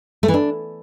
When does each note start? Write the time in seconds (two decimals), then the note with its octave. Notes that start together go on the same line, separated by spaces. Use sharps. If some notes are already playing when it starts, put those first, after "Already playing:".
0.23 A3
0.28 E3
0.34 D4